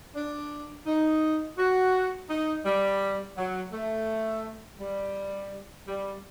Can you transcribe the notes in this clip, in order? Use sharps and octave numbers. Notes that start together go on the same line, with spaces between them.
D4
D#4
F#4
D#4
G3
F#3
A3
G3
G3